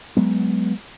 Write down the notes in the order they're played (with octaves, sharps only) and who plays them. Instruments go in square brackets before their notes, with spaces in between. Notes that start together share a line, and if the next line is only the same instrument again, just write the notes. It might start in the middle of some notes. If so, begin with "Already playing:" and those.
[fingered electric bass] F#3 G#3 B3